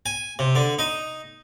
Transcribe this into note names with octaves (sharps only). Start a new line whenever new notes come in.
G#5
C3
D3
D#4